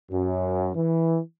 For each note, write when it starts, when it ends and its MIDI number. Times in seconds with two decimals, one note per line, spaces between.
0.11 0.70 42
0.76 1.19 52